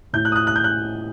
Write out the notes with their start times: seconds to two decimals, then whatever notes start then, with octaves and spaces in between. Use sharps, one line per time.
0.13 A2 G6
0.25 F#6
0.32 D#6
0.36 F#6
0.47 F#6
0.56 G6
0.64 F#6